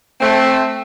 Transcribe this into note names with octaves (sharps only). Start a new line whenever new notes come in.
A3 C4